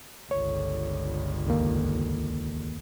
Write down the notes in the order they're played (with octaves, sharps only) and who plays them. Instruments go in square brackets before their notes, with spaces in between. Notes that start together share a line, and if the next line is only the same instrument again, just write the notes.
[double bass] G1 C#2 [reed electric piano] C#5
[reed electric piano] D#2 D#3 A#3